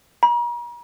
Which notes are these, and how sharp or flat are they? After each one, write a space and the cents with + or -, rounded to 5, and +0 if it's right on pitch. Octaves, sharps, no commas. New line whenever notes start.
A#5 +40